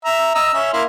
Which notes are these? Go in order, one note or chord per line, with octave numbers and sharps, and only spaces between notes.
E5 A#5
D#5 A#5 E6
C#4 E5
A#3 E4 C6